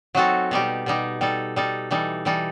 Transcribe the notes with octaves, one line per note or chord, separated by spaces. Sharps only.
F#3 C4 D#4 F#4 A4
B2 G3 D#4 G4
B2 G3 D#4 G4
G3 D#4 A4
G3 D#4 A4
E3 G3 D#4 A4
E3 G3 D#4 A4